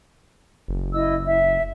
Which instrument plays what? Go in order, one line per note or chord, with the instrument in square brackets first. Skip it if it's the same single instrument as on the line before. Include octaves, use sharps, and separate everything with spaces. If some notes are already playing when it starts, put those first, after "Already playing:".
[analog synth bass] F#1
[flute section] E4 D#5 E6
E5